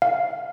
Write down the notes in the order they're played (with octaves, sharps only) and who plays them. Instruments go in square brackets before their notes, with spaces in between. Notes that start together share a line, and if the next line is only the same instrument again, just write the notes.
[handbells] F5